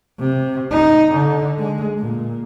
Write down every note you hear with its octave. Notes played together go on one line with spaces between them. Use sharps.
C3
D#4
D3
G#3
A#2